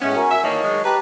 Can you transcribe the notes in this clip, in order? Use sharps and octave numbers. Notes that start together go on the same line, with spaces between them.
A2 G#3 A3 B3 C#4
F#4 A#4 G#5
E5 G#5
D#3 E3 A#3 C#5 D#5 A5
D#3 F#3 G#3
G4 B4 A5 A#5